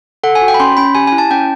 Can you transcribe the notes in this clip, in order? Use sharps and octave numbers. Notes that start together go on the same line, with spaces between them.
A4 F#5
G#5
F#4
G5
B5
C#4 C6
C#4 B5
G4 G#5
G#5
E4
A5
C#4 G5